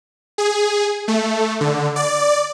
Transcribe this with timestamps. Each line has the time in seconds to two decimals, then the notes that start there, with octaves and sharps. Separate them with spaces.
0.38 G#4
1.08 A3
1.61 D3
1.96 D5